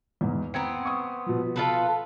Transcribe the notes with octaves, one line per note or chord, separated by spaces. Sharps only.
E2 G#2
B3 C4 A#5 G#6 C#7
C#6 D#6
B2 F3
F4 A4 B4